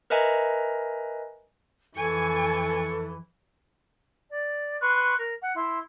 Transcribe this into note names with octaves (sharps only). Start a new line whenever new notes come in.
A#4 B4 D#5 E5 G#5 A#5
F2 E3 A4 G#5 C#6
D5
B4 C6 C#6 F#6
A#4
F#5
E4 C6